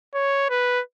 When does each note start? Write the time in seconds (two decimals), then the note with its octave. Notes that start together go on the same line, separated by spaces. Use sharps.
0.15 C#5
0.50 B4